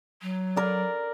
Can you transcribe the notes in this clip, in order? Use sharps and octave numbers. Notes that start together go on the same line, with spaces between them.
F#3
A#4 D5